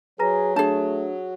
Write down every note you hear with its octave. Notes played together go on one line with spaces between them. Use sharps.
F#3 G#4 B4 A#5 A#6
A3 D4 G#4 A5